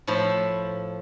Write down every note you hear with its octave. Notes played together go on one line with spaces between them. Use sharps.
A2 F3 E4